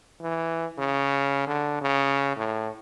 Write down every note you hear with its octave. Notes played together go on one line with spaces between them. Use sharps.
E3
C#3
D3
C#3
A2